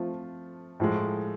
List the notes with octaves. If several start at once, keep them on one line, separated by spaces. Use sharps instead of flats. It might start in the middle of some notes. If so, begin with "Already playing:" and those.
Already playing: F3 A3 C4 F4
A2 F3 G#3